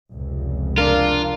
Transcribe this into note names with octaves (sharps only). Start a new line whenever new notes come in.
F1 C#2 C3
D4 F4 A#4